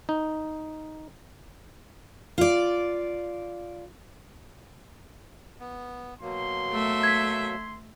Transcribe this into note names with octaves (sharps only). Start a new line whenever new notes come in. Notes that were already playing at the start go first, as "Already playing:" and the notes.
D#4
F4 D5
B3
B2 F#3 A#3 C6
A3 E5
G#6 B6